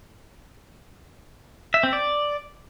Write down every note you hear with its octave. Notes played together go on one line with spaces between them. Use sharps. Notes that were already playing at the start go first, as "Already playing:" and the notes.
E5
C4
D5